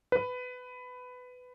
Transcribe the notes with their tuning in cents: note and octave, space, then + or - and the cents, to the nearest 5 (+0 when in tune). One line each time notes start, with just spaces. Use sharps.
B4 +15